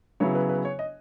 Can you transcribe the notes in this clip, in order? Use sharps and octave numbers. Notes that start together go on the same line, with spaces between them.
C#3 F#3 B3 E4 C#5
B4
B4
C#5
D#5